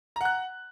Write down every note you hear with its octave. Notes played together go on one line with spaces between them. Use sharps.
F#5 A#5 F#6